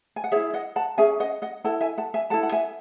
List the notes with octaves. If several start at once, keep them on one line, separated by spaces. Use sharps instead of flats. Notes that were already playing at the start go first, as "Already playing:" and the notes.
G#5
F#5
E4 G#4 C#5 E5
D#5 F#5
F#5 A5
C#4 G#4 E5 G#5
D#5 F#5
D#5 F#5
E4 A4 F#5 A5
E5 G#5
F#5 A5
E5 G#5
E4 A4 F#5 A5
F#5
E5 G#5